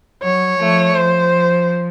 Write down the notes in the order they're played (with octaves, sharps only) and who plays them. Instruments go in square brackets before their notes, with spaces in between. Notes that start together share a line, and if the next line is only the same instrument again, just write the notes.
[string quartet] F#3 [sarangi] C#5
[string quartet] F3 A3
[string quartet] F3 [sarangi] C5